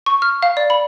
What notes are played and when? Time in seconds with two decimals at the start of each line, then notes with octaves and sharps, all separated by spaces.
0.06 C#6
0.22 F6
0.42 F5
0.57 D5
0.70 B5